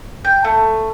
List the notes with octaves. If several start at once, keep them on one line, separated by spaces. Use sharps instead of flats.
G5
A3